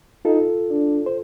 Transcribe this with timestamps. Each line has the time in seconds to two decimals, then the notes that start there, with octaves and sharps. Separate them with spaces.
0.25 D#4 F4 A4
0.71 D4
1.06 C5